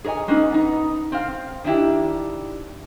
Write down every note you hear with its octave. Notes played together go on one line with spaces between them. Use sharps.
G#4 A#4 C#5 D#5 G#5
G#3 A#3 B3 C#4 D#4
B3 D#4
C4 F5
D#3 D4 E4 G4